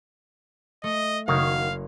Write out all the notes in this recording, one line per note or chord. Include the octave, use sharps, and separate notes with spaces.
A3 D#5
F#1 D#3 F#4 F5 A#5 G#6